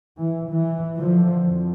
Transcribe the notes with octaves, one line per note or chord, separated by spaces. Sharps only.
E3
E3
D3 F3
F2